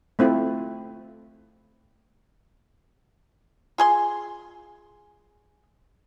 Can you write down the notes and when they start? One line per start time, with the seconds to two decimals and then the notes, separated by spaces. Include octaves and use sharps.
0.19 A3 C4 E4 F4
3.78 F4 G#4 C6